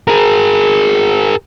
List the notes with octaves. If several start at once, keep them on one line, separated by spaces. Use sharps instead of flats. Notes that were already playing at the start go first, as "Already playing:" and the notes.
G#4 A#4